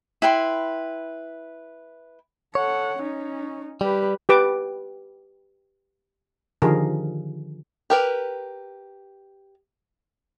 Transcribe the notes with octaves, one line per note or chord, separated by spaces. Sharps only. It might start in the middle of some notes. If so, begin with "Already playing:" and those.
E4 B4 G5 C6
A4 C#5 F#5
C#4 D#4
G3 G4 B4
G4 B4 D6
D3 D#3 F3 G4 G#4 A#4
G4 A#4 B4